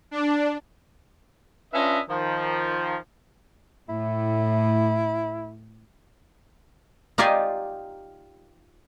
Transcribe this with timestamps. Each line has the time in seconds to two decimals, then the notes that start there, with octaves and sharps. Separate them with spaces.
0.11 D4
1.74 C#4 D4 F4 B4 D#5 E5
2.09 D#3 F3
3.89 A2 E4
7.18 D#4 F4 G4 D5 G#5 C6